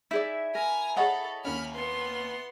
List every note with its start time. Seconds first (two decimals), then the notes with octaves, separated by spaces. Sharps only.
0.11 D#4 E4 G#4 D5 E5
0.55 A#4 G#5 A#5
0.97 G#4 A4 C#5 D#5 F#5 B5
1.45 D#2 C#4 B5 F6
1.74 B3 C6